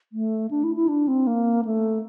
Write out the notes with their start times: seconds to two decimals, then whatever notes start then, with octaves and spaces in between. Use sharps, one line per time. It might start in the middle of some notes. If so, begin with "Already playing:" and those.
0.12 A3
0.50 D4
0.63 E4
0.75 E4
0.88 D4
1.08 C4
1.27 A#3
1.65 A3